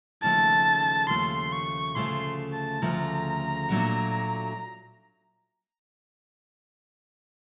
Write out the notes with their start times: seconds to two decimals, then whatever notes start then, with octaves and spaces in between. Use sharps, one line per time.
0.23 D#2 C#3 F3 A3 A5
1.09 D#2 C#3 F3 A3 C6
1.52 C#6
1.95 D2 C#3 F3 A3 C6
2.53 A5
2.82 D2 C#3 F3 A3 A#5
3.69 A#2 F#3 A3 D4 F#4